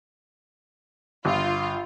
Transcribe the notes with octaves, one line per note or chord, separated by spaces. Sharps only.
G1 F4